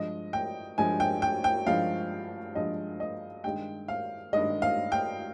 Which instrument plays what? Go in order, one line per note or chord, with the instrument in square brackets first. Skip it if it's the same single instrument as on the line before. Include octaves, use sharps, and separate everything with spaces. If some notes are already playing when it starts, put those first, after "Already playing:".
Already playing: [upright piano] G2 F3 G#3 D#5
G5
G2 F3 G#3 G#5
G5
G5
G5
G2 F3 G#3 F5
G2 F3 G#3 D#5
D#5
G2 D#3 G#3 G5
F5
G2 D#3 G#3 D#5
F5
G5